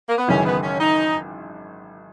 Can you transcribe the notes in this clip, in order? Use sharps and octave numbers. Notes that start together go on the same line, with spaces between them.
A#3
B3
G#1 F#2 C#3 E3 C#4
B3
C#4
D#4